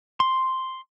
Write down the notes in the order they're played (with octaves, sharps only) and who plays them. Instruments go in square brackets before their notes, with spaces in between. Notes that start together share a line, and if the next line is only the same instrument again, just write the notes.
[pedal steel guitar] C6